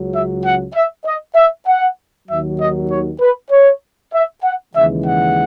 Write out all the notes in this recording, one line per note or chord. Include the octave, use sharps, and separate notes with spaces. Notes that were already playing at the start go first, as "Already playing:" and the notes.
Already playing: C#2 C#3 F#3
E5
F#5
E5
D#5
E5
F#5
D#2 D#3 F#3 E5
D#5
C#5
B4
C#5
E5
F#5
D#2 C#3 E3 G#3 E5
F#5